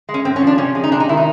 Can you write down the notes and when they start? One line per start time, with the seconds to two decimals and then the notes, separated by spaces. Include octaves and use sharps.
0.09 G#3
0.14 C#4
0.25 G#2 C4
0.36 C#4
0.42 F3 D4
0.58 C3 C#4
0.75 G#3
0.84 D#4
0.91 C3 D4
1.00 D#4
1.09 D#3 E4
1.17 D#4